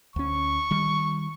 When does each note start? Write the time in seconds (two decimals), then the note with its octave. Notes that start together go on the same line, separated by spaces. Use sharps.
0.16 D2 C#4 C#6
0.71 D#3 G3